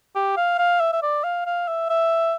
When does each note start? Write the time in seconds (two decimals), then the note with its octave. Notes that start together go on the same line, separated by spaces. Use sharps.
0.15 G4
0.37 F5
0.58 F5
0.80 E5
0.93 E5
1.02 D5
1.24 F5
1.46 F5
1.68 E5
1.90 E5